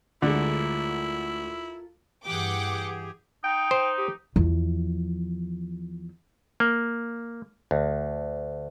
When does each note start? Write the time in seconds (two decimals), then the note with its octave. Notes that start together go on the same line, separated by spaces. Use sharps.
0.22 D2 D3 G#3 E4 F4 A4 A#4
2.25 G2 E3 G4 G#4 F#5 G5 D6
3.44 D#4 G5
3.71 C5
3.98 G4
4.36 E2 F3
6.60 A#3
7.71 D2